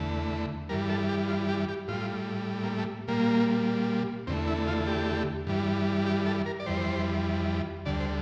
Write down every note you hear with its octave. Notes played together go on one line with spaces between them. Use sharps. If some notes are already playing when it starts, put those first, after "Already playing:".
Already playing: E2 D3 A3
G2 E3 G3 A#4
A4
G4
F4
G4
G4
A2 G3 F4
A#3
A3
A#2 G3 A#3
E2 D3 A3 C4
E4
F4
G4
G2 E3 G3
G4
A4
A#4
D5
F2 E3 G3 C5
D2 D3 G3 D5
C5